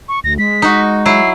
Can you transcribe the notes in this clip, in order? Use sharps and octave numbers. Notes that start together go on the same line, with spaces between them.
C#6
D2 A#6
G#3 B6
D#4 F#4
F#3 E4 C7